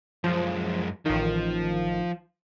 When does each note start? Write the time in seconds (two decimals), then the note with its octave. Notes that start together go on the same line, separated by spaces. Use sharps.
0.24 F#2 F3 G#3
1.06 A1 D#3 F3